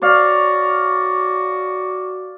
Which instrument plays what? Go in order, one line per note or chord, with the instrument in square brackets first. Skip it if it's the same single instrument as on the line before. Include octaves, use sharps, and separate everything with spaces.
[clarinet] F#4 [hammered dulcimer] C#5 D5 F5